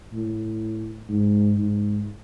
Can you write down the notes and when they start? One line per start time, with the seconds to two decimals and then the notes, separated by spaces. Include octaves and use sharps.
0.13 A2
1.09 G#2
1.58 G#2